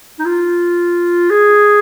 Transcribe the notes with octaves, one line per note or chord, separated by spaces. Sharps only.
D#4
F4
G#4